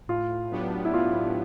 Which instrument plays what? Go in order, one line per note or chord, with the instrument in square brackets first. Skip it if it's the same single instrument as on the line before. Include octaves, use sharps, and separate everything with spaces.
[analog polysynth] A2 [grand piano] F4
[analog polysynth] F#3 B3 D4 G4
[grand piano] E4
[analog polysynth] A2 [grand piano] F4